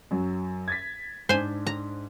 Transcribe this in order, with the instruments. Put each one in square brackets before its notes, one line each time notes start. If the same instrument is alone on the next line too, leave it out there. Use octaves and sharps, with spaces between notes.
[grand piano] F#2 F#3
G#6 A6 B6
[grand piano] G#2 D4 [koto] C5 G#5
[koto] A#5